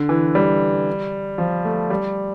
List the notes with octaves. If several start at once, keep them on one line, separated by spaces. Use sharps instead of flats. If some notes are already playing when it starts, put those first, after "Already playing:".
Already playing: D3
E3
G3
F3
A3
G3